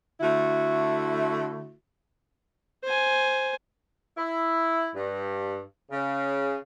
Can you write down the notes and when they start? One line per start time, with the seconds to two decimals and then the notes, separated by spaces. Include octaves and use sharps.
0.20 D3 A3 E4 F#4
2.84 C5 G#5
4.17 E4
4.96 G2
5.92 C#3